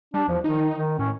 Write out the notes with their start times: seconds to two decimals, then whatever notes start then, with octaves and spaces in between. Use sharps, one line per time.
0.14 G3 D4
0.28 E2 F3
0.44 D#3 D#4
0.76 D#3
0.99 A2 C#4